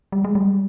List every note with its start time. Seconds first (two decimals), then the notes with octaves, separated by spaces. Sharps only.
0.12 G3
0.25 G#3
0.35 G3